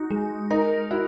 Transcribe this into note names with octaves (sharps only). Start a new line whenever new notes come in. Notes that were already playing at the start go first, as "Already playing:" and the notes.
Already playing: D#4 F#4
G#3
D#4 A#4
E4 F#4